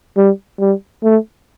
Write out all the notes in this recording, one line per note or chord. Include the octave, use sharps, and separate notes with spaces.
G3
G3
A3